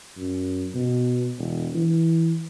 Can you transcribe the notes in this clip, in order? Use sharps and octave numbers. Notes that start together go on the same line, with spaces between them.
F#2
B2
E1
E3